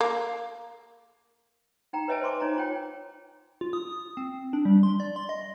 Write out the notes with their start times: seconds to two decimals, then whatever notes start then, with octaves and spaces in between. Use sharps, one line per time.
0.01 A#3
1.93 D#4 G5 A#5
2.08 B4 C#5 D#5 E5 G#5 A5
2.21 C5 D#5 C6 D6
2.40 D#4 C#5 D#5 G#5 A#5
2.57 F4 C#5 G5
3.61 F4
3.73 D#6
3.89 D#6
4.17 C4
4.53 D4
4.65 G3
4.83 C6
5.00 D5
5.16 C6
5.29 D#5